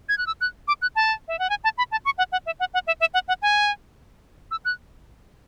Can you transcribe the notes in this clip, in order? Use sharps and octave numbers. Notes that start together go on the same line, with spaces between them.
G#6
F#6
E6
F#6
D6
F#6
A5
E5
F#5
G#5
A5
B5
A5
C#6
F#5
F#5
E5
F#5
F#5
E5
E5
F#5
F#5
G#5
E6
F#6